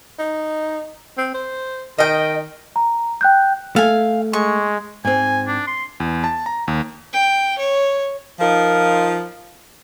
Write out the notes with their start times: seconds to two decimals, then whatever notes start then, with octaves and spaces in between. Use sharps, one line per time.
0.19 D#4
1.17 C4
1.34 C5
1.98 D#3 D#5 G5
2.76 A#5
3.21 G5 F#6 G6
3.76 A3 F5 G#5
4.33 G#3 C#6
5.05 G#2 C4 G#5
5.47 D4
5.67 C6
6.00 E2
6.24 A5
6.46 A#5
6.68 D#2
7.13 G5
7.59 C#5
8.40 F3 D#4 F4 A#4